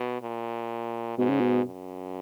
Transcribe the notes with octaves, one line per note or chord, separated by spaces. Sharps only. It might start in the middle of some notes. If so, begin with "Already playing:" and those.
Already playing: B2
A#2
G#2 B2
C#3
B2
F#2